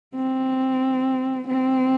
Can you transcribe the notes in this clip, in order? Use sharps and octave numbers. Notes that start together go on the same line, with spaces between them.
C4
C4